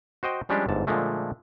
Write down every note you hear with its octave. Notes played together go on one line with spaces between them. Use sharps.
F#4 C5 D#5 G5
F3 G3 G#3 C#4 D4 G4
G1 G#2 A5
A#2 D3 F3 G#3 A3